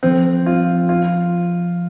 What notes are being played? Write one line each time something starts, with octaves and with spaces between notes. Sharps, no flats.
F3 C4
F4
F4